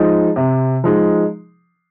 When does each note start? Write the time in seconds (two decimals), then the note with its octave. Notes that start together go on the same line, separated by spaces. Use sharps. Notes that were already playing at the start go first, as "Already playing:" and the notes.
Already playing: F3 G#3 D#4
0.36 C3
0.84 F3 G#3 D#4